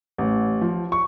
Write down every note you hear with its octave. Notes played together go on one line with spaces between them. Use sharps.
A1
F3
C#6